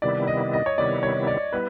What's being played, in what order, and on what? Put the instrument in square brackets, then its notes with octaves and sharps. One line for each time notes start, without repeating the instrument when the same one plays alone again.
[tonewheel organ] C3 D#3 G3 B3 E4 [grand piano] D5
[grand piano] D#5
D#5
C#5
[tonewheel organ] C3 D#3 G3 B3 E4 [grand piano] D5
[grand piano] C#5
D5
[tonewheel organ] G3 B3 E4 [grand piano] B4